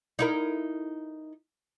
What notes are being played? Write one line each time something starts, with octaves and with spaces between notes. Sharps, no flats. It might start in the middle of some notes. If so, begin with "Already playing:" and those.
D#4 E4 A#4